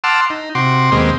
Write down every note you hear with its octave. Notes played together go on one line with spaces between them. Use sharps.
F#5 A5 C6 D6 E6 F6
D#4
C3 F#4 C6 D6
D#2 B2 G#3 A#3 C4 D#5